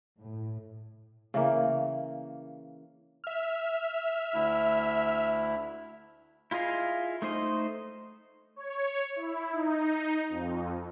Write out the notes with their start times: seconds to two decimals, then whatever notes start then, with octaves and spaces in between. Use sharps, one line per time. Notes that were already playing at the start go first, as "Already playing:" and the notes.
0.18 A2
1.34 C#3 E3 A#3
3.24 E5 F6
4.34 D2 E4
6.51 E4 F4 G#4 D#5 F5
7.22 A3 D#4 C5 D#5
8.56 C#5
9.16 E4
9.52 D#4
10.29 F2